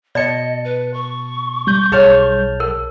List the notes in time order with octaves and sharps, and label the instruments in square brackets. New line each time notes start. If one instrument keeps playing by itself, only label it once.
[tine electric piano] B2 A5 C#7 [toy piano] D5 [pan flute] D#5
[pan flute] B4
C#6
[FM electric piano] G3 G6
[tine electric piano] B1 A5 F6 [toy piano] G#4 C#5
[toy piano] A#4